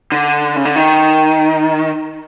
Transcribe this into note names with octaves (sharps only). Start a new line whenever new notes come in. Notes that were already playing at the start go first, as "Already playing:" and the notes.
D3
C#3
D3
D#3